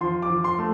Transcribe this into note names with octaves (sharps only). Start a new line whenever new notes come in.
F3 C6
D6
F3
C6
A3